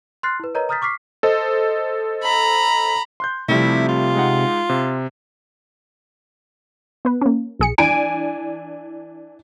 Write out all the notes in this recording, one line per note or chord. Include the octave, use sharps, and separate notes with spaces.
C6 F6 F#6 A6 C7
E4 B4
A#4 B4 C#5 D#5 A#5
A#5 D#6 F6 G6 A6 B6
C#6 D6 F6 B6 C7
A4 C5 D#5
A#5 B5
C6 F#6 G6
C3 F3 G3 A3 E4
F4
G#3 D#4 F#5
C3
B3 B4
A#3 C#4
B1 G#4 C#7
E3 D4 G#5 D7